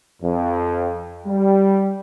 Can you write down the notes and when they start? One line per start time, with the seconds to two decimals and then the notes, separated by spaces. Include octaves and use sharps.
0.23 F2
1.26 G3